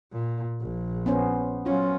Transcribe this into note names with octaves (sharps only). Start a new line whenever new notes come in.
A#2
A#1
B3 C#4 C5
F#3 C#4 F4